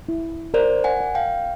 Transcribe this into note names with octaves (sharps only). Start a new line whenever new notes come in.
E4
A#4 C5 D5
F#5 G#5
D5
F5 G5